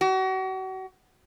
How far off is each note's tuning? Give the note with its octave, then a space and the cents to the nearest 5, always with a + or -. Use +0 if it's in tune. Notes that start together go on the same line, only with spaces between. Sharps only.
F#4 +35